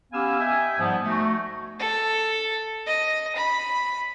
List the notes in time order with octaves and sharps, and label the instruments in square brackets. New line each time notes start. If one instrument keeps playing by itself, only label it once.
[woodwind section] B3 C#4 G4 F5 G#5 E6
D#5 E5 G5 G#5
G#2 F3 G3 B3
A3 D#4 F#4
[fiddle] A4
D#5
B5